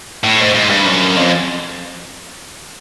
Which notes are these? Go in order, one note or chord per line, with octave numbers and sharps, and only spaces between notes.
A2
G#2
G#2
G2
F#2
F2